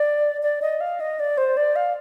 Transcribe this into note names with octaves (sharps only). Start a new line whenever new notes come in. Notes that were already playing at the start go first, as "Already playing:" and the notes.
Already playing: D5
D5
D#5
F5
D#5
D5
C5
D5
F5